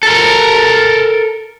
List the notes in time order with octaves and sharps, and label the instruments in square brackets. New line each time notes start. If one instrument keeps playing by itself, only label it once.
[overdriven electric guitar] A4 A#4